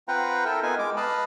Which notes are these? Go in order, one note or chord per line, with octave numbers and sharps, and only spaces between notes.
C4 F4 B4 F#5 G5 A#5
E4 A4 A#4 G5
B3 D#4 F4 A#4 B4 G#5
G#3 D6
B4 D#5 F5 A5 B5